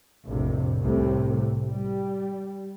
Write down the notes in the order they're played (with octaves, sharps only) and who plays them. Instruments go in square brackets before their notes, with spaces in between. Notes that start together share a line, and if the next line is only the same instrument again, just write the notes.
[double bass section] A#1 F2 A2 C3
C2 A2 C3 A3
G3